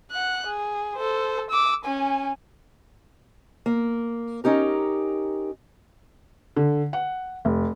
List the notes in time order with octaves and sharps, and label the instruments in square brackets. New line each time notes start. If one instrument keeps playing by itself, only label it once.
[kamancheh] F#5 F#6
G#4
A4 C5
D6 E6
C#4 G#5
[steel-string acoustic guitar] A#3
C#4 D#4 G4 A#4
[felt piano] D3
F#5
F1